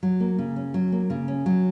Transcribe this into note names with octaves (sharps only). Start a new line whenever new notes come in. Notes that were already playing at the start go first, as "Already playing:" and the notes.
F#3
A#3
C#3
C#4
F#3
A#3
C#3
C#4
F#3